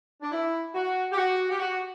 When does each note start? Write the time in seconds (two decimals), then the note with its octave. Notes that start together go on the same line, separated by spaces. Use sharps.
0.21 D4
0.32 E4
0.75 F#4
1.12 G4
1.17 F#4
1.50 G4
1.59 F#4